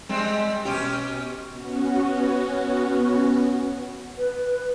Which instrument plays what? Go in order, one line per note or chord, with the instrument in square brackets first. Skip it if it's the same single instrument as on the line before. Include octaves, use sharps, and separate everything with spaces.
[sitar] G3 G#3 C4
B2 C#4 G4
[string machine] B3 C#4 F#4
[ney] B4